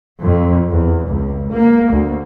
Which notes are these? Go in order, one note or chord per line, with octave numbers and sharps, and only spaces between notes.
F2
E2
C#2
A#3
D2